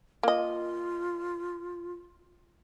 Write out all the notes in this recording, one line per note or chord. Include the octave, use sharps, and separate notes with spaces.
A#3 F4 D#5